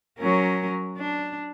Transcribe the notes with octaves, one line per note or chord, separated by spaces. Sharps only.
F#3 C#4 A#4
D4